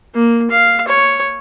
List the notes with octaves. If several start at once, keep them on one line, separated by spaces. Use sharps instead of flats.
A#3
F5
C#5